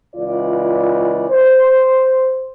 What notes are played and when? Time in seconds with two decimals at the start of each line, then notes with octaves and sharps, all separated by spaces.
0.16 C#2 E3 F4 D5
1.30 C5